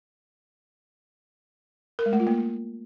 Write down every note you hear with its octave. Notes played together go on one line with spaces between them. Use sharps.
A#4
G#3
A3
F4
A#3